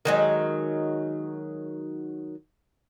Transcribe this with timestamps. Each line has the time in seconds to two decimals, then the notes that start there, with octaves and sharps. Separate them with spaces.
0.05 D#3 F#3 G#3